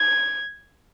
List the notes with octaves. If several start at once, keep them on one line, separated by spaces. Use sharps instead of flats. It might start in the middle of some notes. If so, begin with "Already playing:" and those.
Already playing: G#6